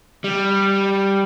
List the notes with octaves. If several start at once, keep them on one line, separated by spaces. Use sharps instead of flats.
G3